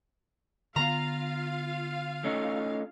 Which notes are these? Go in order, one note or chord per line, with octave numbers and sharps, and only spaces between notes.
D3 B3 F4 F5 A#5
A3 C#4 D#4